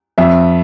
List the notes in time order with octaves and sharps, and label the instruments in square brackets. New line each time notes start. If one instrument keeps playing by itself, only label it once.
[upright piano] F2 E5